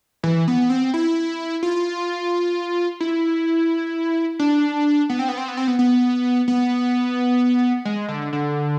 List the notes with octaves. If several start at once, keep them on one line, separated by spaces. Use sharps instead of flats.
E3
B3
C4
E4
F4
E4
D4
B3
C4
B3
C4
B3
C4
B3
B3
B3
G#3
D3
D3